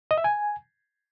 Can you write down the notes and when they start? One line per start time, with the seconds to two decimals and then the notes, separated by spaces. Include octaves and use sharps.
0.11 D#5
0.18 E5
0.24 G#5